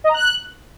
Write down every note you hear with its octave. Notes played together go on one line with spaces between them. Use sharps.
D#5
A#5
F#6